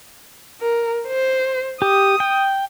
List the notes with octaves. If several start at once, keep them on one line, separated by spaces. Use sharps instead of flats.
A#4
C5
G4 D#6
G5